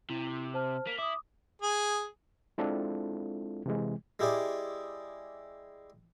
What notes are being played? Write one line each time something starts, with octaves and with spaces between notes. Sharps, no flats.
C3 E4
C5 A5 F6
A#3 B6
E4 D6 D#6
G#4
G#3 C4 D4 E4 F4 A4
C3 E3 G#3
G#3 E4 G4 G#4 D5